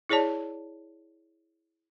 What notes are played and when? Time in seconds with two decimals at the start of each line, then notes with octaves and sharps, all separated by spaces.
0.09 E4 G#4 C#5 D5 A5